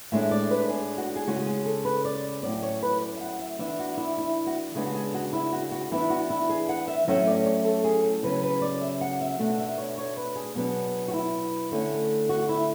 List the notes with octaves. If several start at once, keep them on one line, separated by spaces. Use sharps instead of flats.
A2 G#3 D4 E5
D5
B4
G#4
F#4
G#4
C#3 G#3 C#4 F#4
G#4
A4
B4
D5
A2 F#3 C#4 D5
C#5
B4
D5
E5
F#5
E5
E3 B3 D4 E5
F#4
E4
E4
F#4
C#3 G#3 B3 D4 G#4
F#4
G#4
F#4
E4
F#4
F#4
E3 B3 D4 E4
F#4
E4
G#4
F#5
E5
A2 F#3 A3 C#4 E5
D5
C#5
A4
G#4
A4
C#3 F#3 C#4 B4
B4
D5
E5
F#5
E5
B2 A3 D4 F#5
E5
C#5
C#5
B4
G#4
B2 F#3 B3 D4
F#4
E4
D3 A3 C#4
F#4
E4